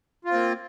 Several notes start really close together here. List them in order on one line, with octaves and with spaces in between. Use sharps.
F4 C4 A#3